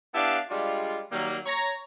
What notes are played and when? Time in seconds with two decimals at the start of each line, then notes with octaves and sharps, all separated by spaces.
0.14 B3 D4 E4 G4 F5 A5
0.50 G3 G#3 D4 F4
1.12 D#3 F#3 G3 A#3
1.46 C#5 A#5